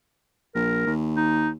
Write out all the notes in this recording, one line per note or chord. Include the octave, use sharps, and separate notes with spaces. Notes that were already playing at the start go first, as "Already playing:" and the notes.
A#1 A#4
D#2
D#4